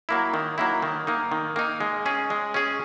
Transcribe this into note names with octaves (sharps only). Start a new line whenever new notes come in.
F#3 A#3 E4
D#3
F#3 A#3 E4
D#3
A#3 D#4
D#3
A#3 D#4
G#3
C#4 G#4
G#3
C#4 G#4